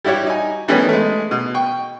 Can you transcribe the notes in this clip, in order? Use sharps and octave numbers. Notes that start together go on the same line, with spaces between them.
G3 E4 F#4 G4 C#5
D#4 G#5
D#3 E3 G3 A3 B3 C#4
G#3 A3
B2
G5 C#6